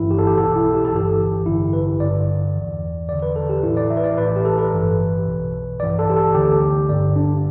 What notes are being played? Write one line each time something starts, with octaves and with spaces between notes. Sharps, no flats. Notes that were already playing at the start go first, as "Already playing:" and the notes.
Already playing: G1 G2 E3 E4
G4
A4
G4
B1 B2 A4
E4
G4
A4
G1 G2 E3 G4
A1 G2 D3 E4
B4
G1 G2 D3 D5
E2 E3
E2 D3 D5
B4
A4
G4
A1 A2 E3 E4
D5
E5
B4
D5
A1 A2 E3 B4
G4
A4
B4
G1 G2 E3
B1 B2
A1 G2 E3 D5
A4
G4
A4
D2 D3 G4
G1 G2 D3 D5
D4